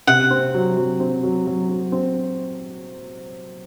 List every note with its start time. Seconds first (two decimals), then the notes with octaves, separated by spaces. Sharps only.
0.07 C3 F#5
0.30 C4
0.54 F#3
0.77 F#3
1.00 C4
1.23 F#3
1.47 F#3
1.69 F#3
1.92 C4